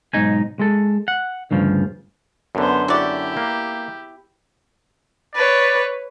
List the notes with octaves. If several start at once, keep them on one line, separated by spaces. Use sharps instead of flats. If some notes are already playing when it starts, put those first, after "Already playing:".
B1 G#2 D#4 G#5
G#3 A4
F#5
D2 G2 C#3 F3
F#2 D3 B3 C5
E4 F#4 G4 D5
A#3
B4 C#5 D5